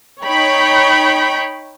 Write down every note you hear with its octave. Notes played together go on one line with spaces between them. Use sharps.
D#4 C#5 G5 B5